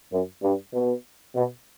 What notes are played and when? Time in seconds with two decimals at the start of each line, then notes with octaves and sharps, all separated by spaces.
0.12 F#2
0.43 G2
0.74 B2
1.35 B2